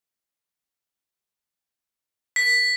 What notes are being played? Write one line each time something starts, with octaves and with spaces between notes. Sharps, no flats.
B6